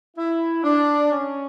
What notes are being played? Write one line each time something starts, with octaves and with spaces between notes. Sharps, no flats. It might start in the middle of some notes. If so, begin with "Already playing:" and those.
E4
D4
C#4